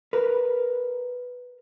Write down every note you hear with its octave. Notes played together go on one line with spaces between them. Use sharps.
A#4 B4